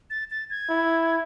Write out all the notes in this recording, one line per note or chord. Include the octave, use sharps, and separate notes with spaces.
A6
A6
G#6
E4